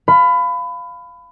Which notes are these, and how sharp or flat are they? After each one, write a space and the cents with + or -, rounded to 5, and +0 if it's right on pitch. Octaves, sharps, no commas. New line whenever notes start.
F5 +0 B5 +25